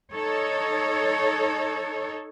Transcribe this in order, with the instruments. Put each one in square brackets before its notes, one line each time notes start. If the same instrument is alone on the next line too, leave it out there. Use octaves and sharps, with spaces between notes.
[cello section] D#4 A4 C#5